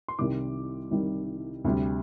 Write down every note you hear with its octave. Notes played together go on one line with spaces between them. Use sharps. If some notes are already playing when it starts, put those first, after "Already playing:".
C6
C2 C3 D#3 G3 D6
C2 C3 D#3 G3
D2 C3 G3